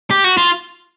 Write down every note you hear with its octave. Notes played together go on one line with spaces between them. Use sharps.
G4
F#4
F4